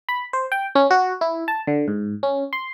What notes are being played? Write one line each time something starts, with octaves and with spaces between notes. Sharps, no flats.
B5
C5
G5
C#4
F#4
E4
A5
D3
G#2
C#4
C6